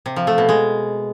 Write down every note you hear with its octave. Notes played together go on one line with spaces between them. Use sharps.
C3
F3
A3
B2
G#3